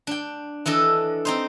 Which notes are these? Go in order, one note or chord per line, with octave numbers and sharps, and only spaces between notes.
D4 G5
E3 D4 A4 D#5
C4 D#4 C5